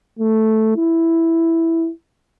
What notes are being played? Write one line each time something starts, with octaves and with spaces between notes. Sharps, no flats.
A3
E4